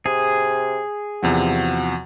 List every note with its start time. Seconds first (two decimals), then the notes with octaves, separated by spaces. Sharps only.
0.06 C3 G#4
1.23 E2 C3 F3 F#4